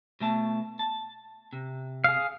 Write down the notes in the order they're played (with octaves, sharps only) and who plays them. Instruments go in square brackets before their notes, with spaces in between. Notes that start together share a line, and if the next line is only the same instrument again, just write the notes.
[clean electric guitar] B2 A3 A5
A5
C3
[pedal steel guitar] G#4 F5